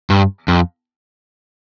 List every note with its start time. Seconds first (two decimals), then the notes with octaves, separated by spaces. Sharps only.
0.10 G2
0.48 F2